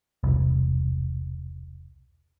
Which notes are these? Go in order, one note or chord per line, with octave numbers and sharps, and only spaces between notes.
E1 C2